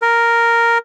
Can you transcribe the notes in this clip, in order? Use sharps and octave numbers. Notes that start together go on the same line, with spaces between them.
A#4